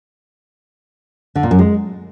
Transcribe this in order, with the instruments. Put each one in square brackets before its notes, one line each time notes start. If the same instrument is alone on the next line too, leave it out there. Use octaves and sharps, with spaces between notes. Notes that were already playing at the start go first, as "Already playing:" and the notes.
[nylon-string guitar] D3
A#2
F#2
G#3